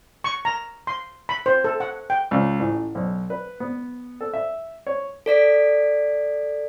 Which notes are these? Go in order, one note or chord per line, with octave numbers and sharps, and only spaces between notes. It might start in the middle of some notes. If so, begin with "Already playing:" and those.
C#6
A#5
C6
B5
C5
A4
F#5
G5
C#2
A1
B1
B4
B3
A4
E5
C#5
A4 D5 B6 D7